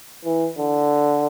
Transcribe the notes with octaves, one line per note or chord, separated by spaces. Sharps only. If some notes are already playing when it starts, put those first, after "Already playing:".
E3
D3